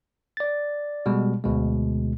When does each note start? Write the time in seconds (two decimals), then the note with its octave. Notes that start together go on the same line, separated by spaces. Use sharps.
0.37 D5 A6
1.06 B2 G3 G#3
1.44 D2 B2 G#3